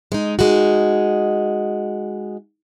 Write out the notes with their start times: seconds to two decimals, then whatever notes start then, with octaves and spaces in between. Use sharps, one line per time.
0.12 G#3 D#4
0.39 G#3 D#4 F#4